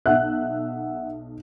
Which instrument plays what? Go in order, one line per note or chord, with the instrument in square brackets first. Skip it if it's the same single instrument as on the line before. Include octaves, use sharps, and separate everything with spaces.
[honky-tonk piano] B1 F#6 [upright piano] E5 F#5